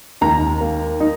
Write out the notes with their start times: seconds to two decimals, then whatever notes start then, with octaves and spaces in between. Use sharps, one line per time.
0.21 D#2 A#5
0.61 A#3
1.00 D#4